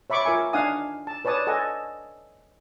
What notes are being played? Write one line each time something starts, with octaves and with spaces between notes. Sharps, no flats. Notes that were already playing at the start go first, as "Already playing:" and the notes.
C#5 E5 B5 C#6 D6
F4 A#4 E5 G#5
D4 D#4 F5 F#5 G#5 D#6
A5
B4 C#5 D5 A5 D#6
A4 D#5 F#5 G#5 A5